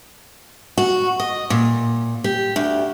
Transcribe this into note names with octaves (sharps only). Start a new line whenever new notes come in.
F#4
D#5
A#2
G4
D2